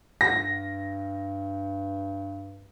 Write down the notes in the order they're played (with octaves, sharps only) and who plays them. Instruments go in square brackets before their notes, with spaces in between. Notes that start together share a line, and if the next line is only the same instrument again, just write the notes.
[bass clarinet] G2 [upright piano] A#6